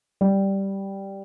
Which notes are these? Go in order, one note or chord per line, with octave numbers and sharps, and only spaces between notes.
G3